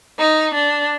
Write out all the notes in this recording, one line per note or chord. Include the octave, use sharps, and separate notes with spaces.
D#4
D4